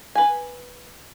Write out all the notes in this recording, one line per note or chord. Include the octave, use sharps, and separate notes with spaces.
B4 G#5